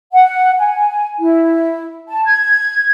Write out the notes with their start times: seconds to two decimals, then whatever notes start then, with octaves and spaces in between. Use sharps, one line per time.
0.13 F#5
0.59 G#5
1.19 E4
2.08 A5
2.26 G#6